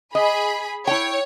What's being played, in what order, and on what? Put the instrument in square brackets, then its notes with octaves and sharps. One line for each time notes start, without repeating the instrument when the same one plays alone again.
[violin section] G#4 B5 [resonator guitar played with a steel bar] D#5
[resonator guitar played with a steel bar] E4 G5 [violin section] C#5